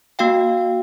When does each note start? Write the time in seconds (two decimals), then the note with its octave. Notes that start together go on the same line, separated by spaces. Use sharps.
0.19 A#3 F#4 F5 G5